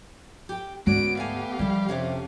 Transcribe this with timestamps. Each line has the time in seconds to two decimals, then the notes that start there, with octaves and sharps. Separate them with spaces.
0.49 G4 G5
0.86 D2 G#2 B3 C#4 F#4 C#5 D5 D7
1.17 A3 G4 F5 G#5
1.59 D#2 E3 F3 G3 F4
1.89 F2 C3 C#4 D4